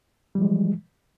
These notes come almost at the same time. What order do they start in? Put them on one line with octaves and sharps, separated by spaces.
G3 F3 G#3 E3